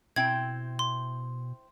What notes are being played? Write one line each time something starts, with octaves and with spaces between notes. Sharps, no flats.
B2 C4 E4 G5 G#6
C6